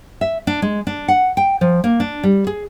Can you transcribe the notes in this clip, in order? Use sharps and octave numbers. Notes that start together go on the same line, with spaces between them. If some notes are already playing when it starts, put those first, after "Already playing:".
E5
D4
G#3
D4
F#5
G5
F3
A#3
D4
G3
G#4